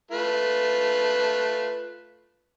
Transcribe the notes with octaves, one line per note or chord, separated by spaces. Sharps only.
A3 F4 B4